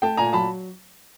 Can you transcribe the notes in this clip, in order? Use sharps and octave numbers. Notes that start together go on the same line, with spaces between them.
A3 G5 A5
A#2 G#5 A#5
F#3 A5 B5